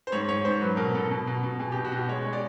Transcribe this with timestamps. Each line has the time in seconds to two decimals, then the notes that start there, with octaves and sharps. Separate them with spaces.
0.07 C5
0.12 G#2 C#5
0.28 G#2 C#5
0.45 G#2 C5
0.61 F#3 B4
0.77 B2 A#4
0.94 B2 A4
1.11 B2
1.27 B2
1.43 B2
1.59 B2 G#4
1.72 G4
1.76 B2
1.85 F#4
1.92 B2 G4
2.08 G#3 C#5
2.25 G#3
2.33 D5